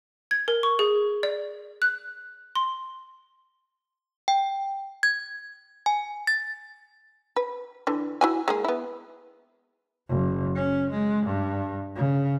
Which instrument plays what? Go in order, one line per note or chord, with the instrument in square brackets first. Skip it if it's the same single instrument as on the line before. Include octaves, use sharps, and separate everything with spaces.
[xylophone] G#6
A#4
C#6
G#4
D5
F#6
C6
[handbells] G5
G#6
G#5
A6
[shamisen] B4
D3 E3
E4 F#4 G#5
G#3 A#3 G#4
B3 E4
[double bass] F#1
C#4
G#3
G2
C#3